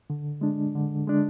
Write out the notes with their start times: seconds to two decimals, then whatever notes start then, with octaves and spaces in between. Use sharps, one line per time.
0.10 D3
0.41 G#3 D4
0.75 D3
1.07 G#3 D4